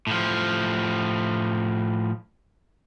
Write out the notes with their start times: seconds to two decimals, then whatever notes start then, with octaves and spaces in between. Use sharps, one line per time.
0.07 A2 F3